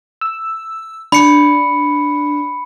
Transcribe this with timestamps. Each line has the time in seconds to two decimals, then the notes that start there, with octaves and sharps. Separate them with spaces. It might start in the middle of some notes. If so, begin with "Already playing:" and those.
0.21 E6
1.12 D4 B5 C#7